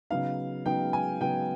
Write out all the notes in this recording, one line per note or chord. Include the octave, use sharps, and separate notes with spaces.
C#3 F#3 B3 D#4 F5
C#3 F#3 B3 D#4 G5
G#5
C#3 F#3 B3 D#4 G5